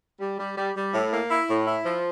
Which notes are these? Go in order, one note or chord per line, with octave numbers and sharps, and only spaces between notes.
G3
G3
G3
G3
A2
A#3
E4
A2
E4
F3